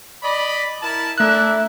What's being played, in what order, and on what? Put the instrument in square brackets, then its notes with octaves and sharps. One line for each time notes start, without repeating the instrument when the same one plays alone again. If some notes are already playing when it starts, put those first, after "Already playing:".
[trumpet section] D5 D#5 B5
E4 A#4 A5
[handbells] A3 F#6 [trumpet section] D4 E4 E5